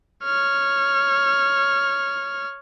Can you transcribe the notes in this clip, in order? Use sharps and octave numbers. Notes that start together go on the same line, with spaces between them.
C#5 F6